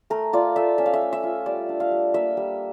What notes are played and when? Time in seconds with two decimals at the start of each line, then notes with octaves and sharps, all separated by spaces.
0.10 A3 A#4
0.33 F4 D5
0.56 A3 E5
0.78 C#4 E5
0.86 F5
0.93 E5
1.02 A3
1.13 E5
1.23 F4
1.46 G3 D5
1.69 D4
1.80 F5
1.91 G3
2.14 A#3 E5
2.37 G3